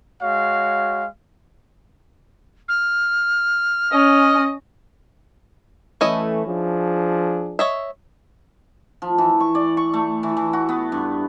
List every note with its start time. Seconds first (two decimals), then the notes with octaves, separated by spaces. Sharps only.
0.22 G#3 F#4 C#5 F5
2.68 F6
3.92 C#4 D#5
6.01 E3 A3 C#4 E4 D#5
6.47 F3 D4 G#4
7.59 C#5 D#5 E5
9.02 F3
9.18 E3
9.40 C#6
9.55 D5
9.77 C#6
9.93 A3
10.23 E3
10.37 E3
10.53 F#4
10.69 B3
10.92 G2